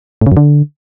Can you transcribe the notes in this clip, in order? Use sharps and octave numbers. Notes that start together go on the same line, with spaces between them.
A2
C#3
F#2
D3